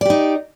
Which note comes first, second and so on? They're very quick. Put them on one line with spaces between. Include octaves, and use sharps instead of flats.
D5 G4 D#4